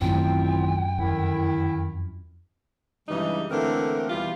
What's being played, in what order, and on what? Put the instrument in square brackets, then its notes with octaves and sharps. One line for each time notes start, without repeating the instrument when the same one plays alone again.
[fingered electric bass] A1 D#3 A3 [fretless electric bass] F#2 [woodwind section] C4 E4 F4 [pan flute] G5
[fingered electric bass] F2 [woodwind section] D3 D#3 E4
[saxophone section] G2 C#3 E3 G3 G#3 D#4
D3 E3 A3 A#3 C4 A#4
E2 B2 E3 G3 F4